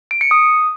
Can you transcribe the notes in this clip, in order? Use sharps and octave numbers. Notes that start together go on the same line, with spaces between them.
D7
C#7
D#6